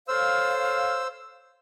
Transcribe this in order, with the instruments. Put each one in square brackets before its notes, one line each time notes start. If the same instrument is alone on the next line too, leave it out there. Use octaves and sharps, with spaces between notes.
[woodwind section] A4 C#5 F5 [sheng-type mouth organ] C5 E6